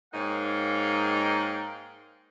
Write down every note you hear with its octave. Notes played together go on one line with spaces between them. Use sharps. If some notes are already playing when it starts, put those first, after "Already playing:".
G#2 A#3 D#4 C#5 F5 G5